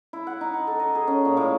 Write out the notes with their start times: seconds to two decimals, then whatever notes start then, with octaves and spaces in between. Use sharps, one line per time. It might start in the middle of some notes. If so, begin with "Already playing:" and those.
0.13 E4
0.27 F#5
0.41 D#4
0.54 F#5
0.67 A4
0.80 D#5
0.95 G#4
1.07 C#4
1.25 A#2
1.37 A2